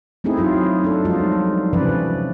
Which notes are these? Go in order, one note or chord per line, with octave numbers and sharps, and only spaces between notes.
A3 C4 D#4 E4 G#4
F#3 F4 G#4
D4 A4
F3 F#3 G#3 D#4 F4
G3
C3 E3 F3 C#4 B4 D5